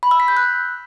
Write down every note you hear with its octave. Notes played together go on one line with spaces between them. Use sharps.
B5
E6
B6
G6
F#6